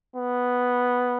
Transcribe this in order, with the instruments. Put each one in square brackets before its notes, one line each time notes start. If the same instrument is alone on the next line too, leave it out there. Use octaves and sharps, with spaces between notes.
[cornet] B3